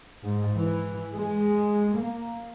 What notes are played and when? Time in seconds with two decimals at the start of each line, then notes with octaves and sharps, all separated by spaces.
0.24 G#2
0.55 E3
1.14 G#3
1.97 A#3